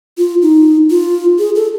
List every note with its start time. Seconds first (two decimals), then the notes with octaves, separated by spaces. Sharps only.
0.18 F4
0.42 D#4
0.90 F4
1.39 G#4
1.56 A4